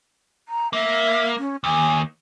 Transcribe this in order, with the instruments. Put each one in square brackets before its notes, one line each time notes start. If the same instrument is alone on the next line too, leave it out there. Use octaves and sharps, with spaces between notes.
[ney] A#5
[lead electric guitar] A#3 [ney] E5
[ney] C#4
[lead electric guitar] D#2 [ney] G#5